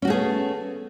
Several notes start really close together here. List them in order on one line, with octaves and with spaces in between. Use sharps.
C#4 F#4 A3 G#4 B3